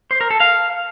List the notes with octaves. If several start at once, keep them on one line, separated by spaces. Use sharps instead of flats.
C5
A#4
A4
F5